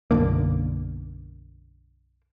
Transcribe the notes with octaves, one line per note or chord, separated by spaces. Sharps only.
B1 F#2 D3 A#3